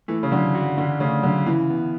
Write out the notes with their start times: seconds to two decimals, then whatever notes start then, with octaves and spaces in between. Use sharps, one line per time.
0.08 E3 A3
0.23 C#3
0.32 D3 F#3
0.55 F#4
0.78 D3 D4
1.00 C#3 A3
1.23 D3 F#3
1.46 C#3 E3
1.70 B3